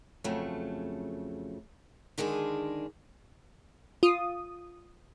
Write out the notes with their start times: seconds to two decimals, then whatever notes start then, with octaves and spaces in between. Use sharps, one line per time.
0.24 F2 C#3 F#3 A3
2.18 D3 D#3 G#3 D4 G#4
4.03 F4 D#6